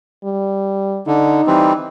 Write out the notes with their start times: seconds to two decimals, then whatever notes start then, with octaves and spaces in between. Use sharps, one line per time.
0.24 G3
1.07 D3 D#4
1.47 E3 G3 C4